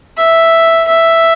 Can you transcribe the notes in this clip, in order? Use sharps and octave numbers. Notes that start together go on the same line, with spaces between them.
E5
E5